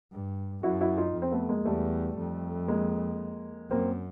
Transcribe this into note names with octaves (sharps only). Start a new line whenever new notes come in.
G2
F#2 E4 F#4
E4 F#4
D#4 F4
F2
C4
A3 B3
G#3 A#3
E2 G3 A3
F2
G#3 A#3
F#2 A#3 C4